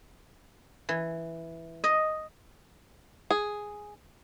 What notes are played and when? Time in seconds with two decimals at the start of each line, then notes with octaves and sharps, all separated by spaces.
0.89 E3
1.84 D#5
3.30 G#4